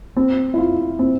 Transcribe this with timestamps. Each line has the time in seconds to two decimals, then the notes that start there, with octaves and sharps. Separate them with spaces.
0.17 C4
0.54 E4
0.58 F4
0.99 C4